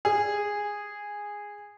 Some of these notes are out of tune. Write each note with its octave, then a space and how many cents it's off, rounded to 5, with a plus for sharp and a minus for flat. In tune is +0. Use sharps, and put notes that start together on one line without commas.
G#4 -10